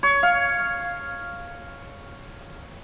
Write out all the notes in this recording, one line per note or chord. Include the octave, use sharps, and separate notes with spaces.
C#5
F5